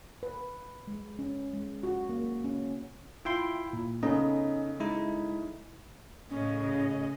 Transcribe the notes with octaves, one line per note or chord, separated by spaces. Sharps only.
B4
G#3
C#4
G#3
F#4
A#3
C#4
E4 F4 G5 C6
A#2
C#3 A3 B3 C#4 D#4 D#5
G#3 D#4 E4
A2 C#3 C#4 D#5